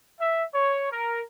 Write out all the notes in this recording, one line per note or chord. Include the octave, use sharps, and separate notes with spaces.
E5
C#5
A#4